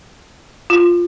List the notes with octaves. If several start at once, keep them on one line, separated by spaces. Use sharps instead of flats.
F4